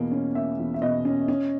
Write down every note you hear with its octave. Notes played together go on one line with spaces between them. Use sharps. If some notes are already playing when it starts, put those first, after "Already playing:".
Already playing: E2 B2 A#3
C#4
A#3 E5
E2
E5
B2 D#5
C#4
C#4